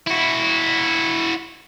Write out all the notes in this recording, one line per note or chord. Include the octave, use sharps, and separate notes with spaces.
E4 F#4